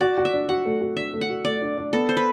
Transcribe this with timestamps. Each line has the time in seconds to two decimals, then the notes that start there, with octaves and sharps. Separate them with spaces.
0.01 F#4 D5
0.18 F#4
0.25 E5
0.33 D4
0.49 F#4 F#5
0.65 A3
0.81 F#4
0.97 D4 E5
1.13 A3
1.21 F#5
1.30 F#4
1.45 A3 D5
1.62 D4
1.78 D4
1.93 B3 A4
2.09 C5
2.17 B4